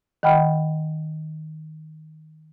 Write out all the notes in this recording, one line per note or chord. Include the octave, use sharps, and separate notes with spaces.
D#3 D#5 F#5 G5 B5 F6